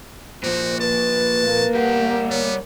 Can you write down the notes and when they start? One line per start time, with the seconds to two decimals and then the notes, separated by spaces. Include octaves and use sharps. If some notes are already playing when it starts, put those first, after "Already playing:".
0.43 A#2 F3 F#4 C5
0.80 B4 A5
1.44 A#3
1.75 G3 G4 F#5
2.30 B3 C#5